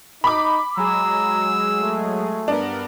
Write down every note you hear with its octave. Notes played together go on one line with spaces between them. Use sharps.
D#4 B5 D6
F#3 G#3 G#4 A#5 E6
A3
G2 B3 D4 A#4